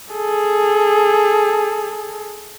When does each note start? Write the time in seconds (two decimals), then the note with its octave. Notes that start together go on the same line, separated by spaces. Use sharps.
0.14 G#4 A4